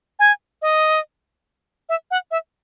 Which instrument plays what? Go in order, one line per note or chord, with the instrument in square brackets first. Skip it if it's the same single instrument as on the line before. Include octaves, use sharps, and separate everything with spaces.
[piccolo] G#5
D#5
E5
F#5
E5